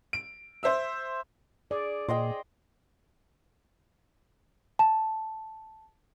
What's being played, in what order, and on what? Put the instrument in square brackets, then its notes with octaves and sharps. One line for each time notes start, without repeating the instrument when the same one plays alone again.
[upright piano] D7
C5 E5 E6
[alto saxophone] G#4 [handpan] D5
[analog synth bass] A#2 [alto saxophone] G#4 [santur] C5 D#5 G5
[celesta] A5